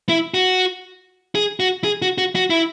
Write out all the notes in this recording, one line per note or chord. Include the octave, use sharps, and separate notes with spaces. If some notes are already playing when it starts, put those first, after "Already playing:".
E4
F#4
G#4
F#4
G#4
F#4
F#4
F#4
E4